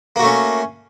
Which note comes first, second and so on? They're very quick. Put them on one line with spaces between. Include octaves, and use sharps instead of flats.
A#3 F#4 A3 C#4